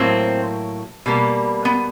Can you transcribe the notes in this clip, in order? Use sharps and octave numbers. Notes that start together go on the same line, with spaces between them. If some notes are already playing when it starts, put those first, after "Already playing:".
Already playing: A2 F#3 A#3 C4
B2 G3 A#3
B3